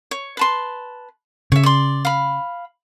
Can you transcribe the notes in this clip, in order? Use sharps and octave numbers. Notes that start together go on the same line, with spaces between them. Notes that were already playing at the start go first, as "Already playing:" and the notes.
C#5
B4 A5 C6
C#3 C#5 E5
D5 C6
F5 B5